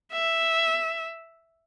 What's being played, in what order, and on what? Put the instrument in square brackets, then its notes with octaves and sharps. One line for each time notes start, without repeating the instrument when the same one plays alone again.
[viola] E5